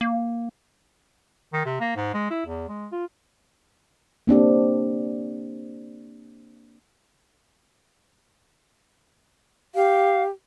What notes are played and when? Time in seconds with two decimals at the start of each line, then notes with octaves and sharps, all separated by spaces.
0.01 A#3
1.53 D#3
1.65 C3
1.80 A#3
1.96 G#2
2.14 G#3
2.30 E4
2.46 E2
2.68 G#3
2.92 F4
4.27 A#3 C4 D4 G4
9.75 G4 F5